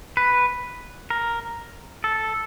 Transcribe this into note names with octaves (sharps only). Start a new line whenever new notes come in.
B4
A#4
A4